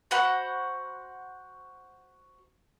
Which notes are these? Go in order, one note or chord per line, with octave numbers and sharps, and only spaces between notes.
F#4 C5 F#5 B5